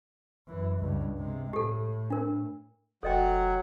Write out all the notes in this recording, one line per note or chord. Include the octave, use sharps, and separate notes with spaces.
F#2 E3
C#2 G2
C3 G#3
A2 G4 A4
D4 A#4
F1 F#3 A4 D#5 F#5 G5